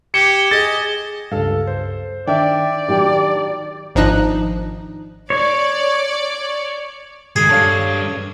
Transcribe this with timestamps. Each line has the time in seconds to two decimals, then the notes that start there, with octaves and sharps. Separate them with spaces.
0.14 G4 G#6 C#7 E7 G7
0.51 G#4 D#5 A6
1.32 C#2 G2 A4 F5
1.67 C5
2.28 D#3 D4 D5 E5 G5
2.89 D#3 F#3 D4 F#4 G4
3.95 G#1 F3 D4 D#4 D#5 F#6
5.30 C#5 D5
7.36 D#3 G#3 G#4
7.49 G3 D4 A4 C#5 F5